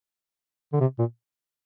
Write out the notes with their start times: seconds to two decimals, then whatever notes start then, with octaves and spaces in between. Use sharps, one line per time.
0.73 D3
0.80 C3
0.99 A#2